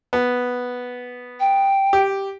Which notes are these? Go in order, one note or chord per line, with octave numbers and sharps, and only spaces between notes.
B3
G5
G4